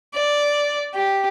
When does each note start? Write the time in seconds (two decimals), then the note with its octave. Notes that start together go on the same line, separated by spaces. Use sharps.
0.14 D5
0.94 G4